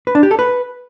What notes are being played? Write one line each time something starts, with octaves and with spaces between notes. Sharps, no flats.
B4
D4
G4
A4
B4